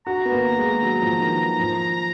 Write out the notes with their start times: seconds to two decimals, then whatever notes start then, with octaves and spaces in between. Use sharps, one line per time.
0.07 F#4 A#5
0.25 B3
0.32 A#3
0.58 G#3
0.82 F#3
1.02 F3
1.20 D#3
1.60 F3